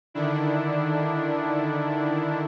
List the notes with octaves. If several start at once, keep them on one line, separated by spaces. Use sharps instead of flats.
D3 D#3 D4 E4